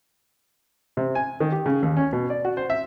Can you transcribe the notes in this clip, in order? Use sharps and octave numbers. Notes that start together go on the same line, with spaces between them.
C3
G#5
D#3
G4
C#3
D#2
C#4
B2
D5
F#4
C5
E5